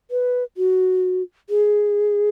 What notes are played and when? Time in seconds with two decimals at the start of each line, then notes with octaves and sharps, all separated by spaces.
0.11 B4
0.57 F#4
1.49 G#4